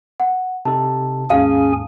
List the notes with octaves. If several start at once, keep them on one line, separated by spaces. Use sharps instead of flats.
F#5
C3 D#4 A4 A5
D#2 G#2 C#4 G#4 F5 G#5